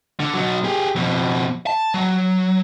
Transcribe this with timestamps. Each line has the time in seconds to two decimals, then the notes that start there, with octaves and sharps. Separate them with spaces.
0.20 D3
0.34 B2 F#3
0.64 G4 G#4
0.95 F2 B2
1.67 A5
1.94 F#3